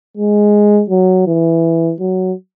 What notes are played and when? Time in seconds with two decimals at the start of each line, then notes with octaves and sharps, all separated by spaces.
0.17 G#3
0.90 F#3
1.27 E3
2.00 F#3